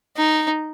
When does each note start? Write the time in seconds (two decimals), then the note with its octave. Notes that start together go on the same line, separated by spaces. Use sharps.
0.16 D#4